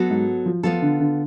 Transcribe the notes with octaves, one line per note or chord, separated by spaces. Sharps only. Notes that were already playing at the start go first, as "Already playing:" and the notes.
Already playing: F#3 B3 F#4 A4
G#2
F3
F3 B3 F4 A4
D3
D3